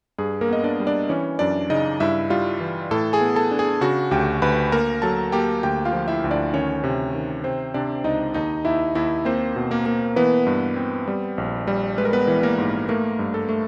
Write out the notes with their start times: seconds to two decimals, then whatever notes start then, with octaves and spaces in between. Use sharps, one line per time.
0.18 G2 G#4
0.41 A#3 A#4
0.49 B3 D#5
0.64 D4 D5
0.80 G3
0.87 D4 D5
1.09 E3 C#4 C#5
1.39 F#2 D4 D5
1.70 C#3 D#4 D#5
2.00 G2 E4 E5
2.30 G3 F4 F5
2.60 E3
2.91 A2 A4 A5
3.13 G#4 G#5
3.21 B3
3.36 A4 A5
3.51 D4
3.59 G#4 G#5
3.81 C#3 F#4 F#5
4.11 D2 G4 G5
4.42 D2 B4 B5
4.72 A#3 A#4 A#5
5.02 F#3 A4 A5
5.32 A#3 G4 G5
5.63 D2 G4 G5
5.85 F4 F5
5.93 F3
6.08 E4 E5
6.24 D2
6.31 D4 D5
6.53 D#3 C#4 C#5
6.84 C3
7.14 D#3
7.44 C3 C4 C5
7.74 C3 D4 D5
8.04 C#2 D#4 D#5
8.34 D#2 D#4 D#5
8.65 D#2 E4 E5
8.95 D#2 E4 E5
9.25 A#3 C4 C5
9.56 B2
9.71 A#3 A#4
9.86 A#3
10.16 E3 B3 B4
10.47 G2
10.76 C4
11.08 G3
11.38 A#1
11.67 G3
11.98 G#3 B4
12.05 A#4
12.13 B3 B4
12.27 E3
12.43 A#3 A#4
12.58 G#2
12.89 A3 A#3 A#4
13.19 G2
13.34 A4
13.49 A3